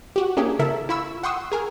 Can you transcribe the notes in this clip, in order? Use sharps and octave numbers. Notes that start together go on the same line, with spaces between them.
F#4 G4
A#3 C#4 D4 E4 G4 G#4
C#3 E4 A4 A#4 E5
E4 F4 B5 C#6 E6
F#5 G5 C6 C#6 D#6 E6
G#4 A#4 G#5